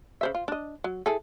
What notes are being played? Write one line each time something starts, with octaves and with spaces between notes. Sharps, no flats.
C#3 C5 E5
F4
D4 D#5
F#3
E4 G#4 A4